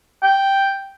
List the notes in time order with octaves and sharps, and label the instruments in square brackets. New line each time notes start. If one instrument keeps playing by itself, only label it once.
[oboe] G5